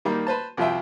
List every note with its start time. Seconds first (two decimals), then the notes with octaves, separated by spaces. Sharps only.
0.05 D#3 G3 A#3
0.27 B4 C5 A5
0.57 C2 F3 F4 E5 G5